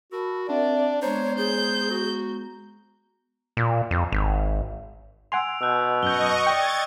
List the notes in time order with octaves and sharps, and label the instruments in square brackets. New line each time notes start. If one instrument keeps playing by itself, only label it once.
[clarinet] F#4 [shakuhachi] A#4 [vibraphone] A5 B5 E6
[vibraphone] C4 E5 F#5 [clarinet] D4 [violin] D5
[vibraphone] G#3 B3 A#5 [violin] D4 [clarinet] C5 [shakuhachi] C#5
[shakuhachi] G#4 [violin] G6
[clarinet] F#4
[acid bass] A#2
F2
G#1
[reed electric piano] F#5 G#5 C6 [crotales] E6 D7 F7
[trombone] B2 [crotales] E6 F#6 G6
[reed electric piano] F#2 G6 [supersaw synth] D#5 C#6 [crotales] G7
[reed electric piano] D5 G5 [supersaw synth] G#6 A6